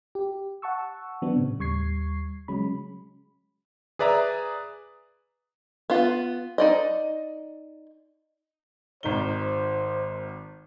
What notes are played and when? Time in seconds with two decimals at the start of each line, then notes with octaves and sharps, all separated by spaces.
0.15 G4
0.62 F#5 A5 C#6 E6
1.22 E3 F#3 B3 C4 D4
1.36 A2 C#3
1.59 D#2 G3 C#6 G#6 C7
2.48 C#3 F#3 G#3 C#4 B5
3.99 G#4 B4 D5 E5 A#5
5.90 B3 F4
6.58 D#4 D5 D#5
9.03 G#1 D#3 C5 G7